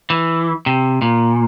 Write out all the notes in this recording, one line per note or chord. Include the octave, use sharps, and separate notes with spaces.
E3
C3
A#2